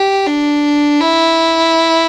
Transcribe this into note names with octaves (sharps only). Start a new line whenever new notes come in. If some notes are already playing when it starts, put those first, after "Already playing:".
Already playing: G4
D4
E4